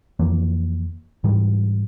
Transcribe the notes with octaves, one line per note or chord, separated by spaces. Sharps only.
F2 E3 A#3
G#2 E3 G3